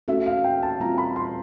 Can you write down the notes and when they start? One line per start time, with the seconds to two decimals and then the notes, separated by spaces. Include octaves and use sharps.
0.08 A3 C#4 F#4 A4 E5
0.26 F5
0.44 G5
0.63 A5
0.80 G3 C4 F4 A#5
0.98 B5
1.16 C6